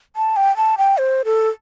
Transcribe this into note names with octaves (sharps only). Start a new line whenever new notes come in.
A5
G5
A5
G5
C5
A4